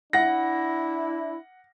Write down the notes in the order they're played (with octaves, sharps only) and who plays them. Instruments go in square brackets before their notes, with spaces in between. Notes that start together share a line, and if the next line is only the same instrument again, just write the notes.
[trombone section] D4 E4 [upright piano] F#5 A#6